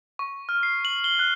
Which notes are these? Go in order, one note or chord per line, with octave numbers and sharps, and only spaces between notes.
C#6
F6
C7
F#7
G7
F#6